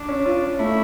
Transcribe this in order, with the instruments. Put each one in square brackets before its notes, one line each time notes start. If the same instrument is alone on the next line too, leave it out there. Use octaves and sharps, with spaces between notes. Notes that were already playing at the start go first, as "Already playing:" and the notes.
Already playing: [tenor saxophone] D4
[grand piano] C#4
F4
C#4
[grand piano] A3 [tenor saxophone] E4